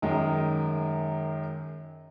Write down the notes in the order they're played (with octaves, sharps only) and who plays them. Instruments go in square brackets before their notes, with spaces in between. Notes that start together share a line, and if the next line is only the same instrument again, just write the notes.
[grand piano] F#2 D#3 G#3